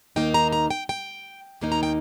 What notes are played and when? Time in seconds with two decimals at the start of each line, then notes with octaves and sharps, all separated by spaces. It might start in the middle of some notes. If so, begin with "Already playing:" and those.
0.16 D#2 D#3 A#3 D#4 G5
0.34 A#5
0.52 A#5
0.70 G5
0.89 G5
1.61 D#2 D#3 A#3 D#4
1.72 A#5
1.83 G5